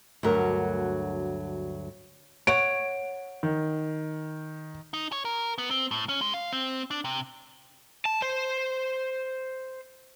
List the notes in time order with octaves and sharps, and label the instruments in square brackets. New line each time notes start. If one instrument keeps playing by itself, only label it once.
[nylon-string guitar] D2 G2 F#3 A#4
[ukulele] C#5 F#5 [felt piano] D7
[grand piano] D#3
[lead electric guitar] D#4
C#5
A#4
B3
C4
A2
C#4
G#3
F5
C4
D4
C3
[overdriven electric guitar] A5
C5